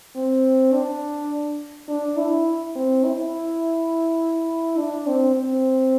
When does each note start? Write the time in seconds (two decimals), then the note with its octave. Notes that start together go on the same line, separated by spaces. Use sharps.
0.16 C4
0.74 D4
1.88 D4
2.18 E4
2.75 C4
3.05 E4
4.78 D4
5.07 C4
5.35 C4